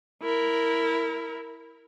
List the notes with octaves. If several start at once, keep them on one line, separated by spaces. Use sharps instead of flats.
E4 A#4